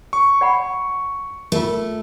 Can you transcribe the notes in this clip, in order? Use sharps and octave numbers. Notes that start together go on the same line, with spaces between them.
C#6
D5 F#5 B5
A3 F4 A#4